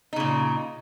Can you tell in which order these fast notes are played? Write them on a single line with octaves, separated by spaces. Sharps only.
D#4 C#3 A#2